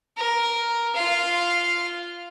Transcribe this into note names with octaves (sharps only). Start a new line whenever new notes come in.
A#4
F4 F5